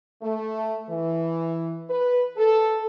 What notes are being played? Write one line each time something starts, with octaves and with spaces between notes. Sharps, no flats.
A3
E3
B4
A4